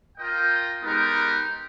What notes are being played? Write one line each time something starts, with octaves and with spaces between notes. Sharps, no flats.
F4 A#4 D#5 G5
G#3 B3 D#4 G4 A#4